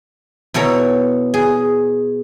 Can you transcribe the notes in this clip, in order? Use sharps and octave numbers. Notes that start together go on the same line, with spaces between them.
B2 E4 A4 C#5 A#5
G#4